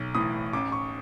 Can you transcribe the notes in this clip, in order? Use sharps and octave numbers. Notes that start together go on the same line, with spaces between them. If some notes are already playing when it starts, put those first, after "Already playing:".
Already playing: B1
A2 E3 D#6
A1 D6
C#6